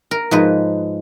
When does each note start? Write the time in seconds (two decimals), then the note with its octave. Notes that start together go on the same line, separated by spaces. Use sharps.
0.11 A#4
0.31 G#2 F3 G#3 B4